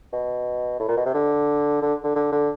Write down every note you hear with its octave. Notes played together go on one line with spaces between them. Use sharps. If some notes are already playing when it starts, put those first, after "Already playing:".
B2
A2
A#2
B2
C3
D3
D3
D3
D3
D3